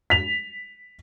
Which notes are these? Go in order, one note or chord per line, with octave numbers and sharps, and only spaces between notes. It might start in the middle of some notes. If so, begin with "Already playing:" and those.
B6 F7